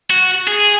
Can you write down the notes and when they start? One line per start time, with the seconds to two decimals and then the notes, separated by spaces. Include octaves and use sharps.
0.10 F#4
0.48 G#4